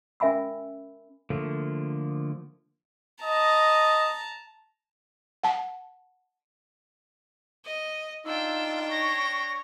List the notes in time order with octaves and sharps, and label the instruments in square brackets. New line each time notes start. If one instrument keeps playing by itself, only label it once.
[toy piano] C#4 A#4 E5 G#5 B5 E6
[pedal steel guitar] D3 F3 A3 A#3
[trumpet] D#5 [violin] A5 A#5
[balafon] F#5 A5
[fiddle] D#5
[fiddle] D4 G5 [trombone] D#4 [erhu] F4 [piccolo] E6
[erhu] C#5 [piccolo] A#6